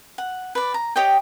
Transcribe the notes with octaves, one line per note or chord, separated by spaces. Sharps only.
F#5
B4 D5
A#5
G4 C#5 D#5 G5